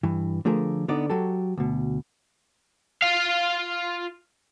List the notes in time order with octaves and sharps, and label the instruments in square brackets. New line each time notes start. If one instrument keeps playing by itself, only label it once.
[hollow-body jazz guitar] G2 E3
D3 F3 A3 G#4 A#4
D3 B3 D#4 D5
F#3 F#4 G4 A4
D2 B2
[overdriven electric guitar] F4 F5